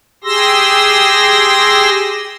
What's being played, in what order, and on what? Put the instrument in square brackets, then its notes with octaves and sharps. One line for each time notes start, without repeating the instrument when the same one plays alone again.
[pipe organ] G4 G#4 C6 E6 A#6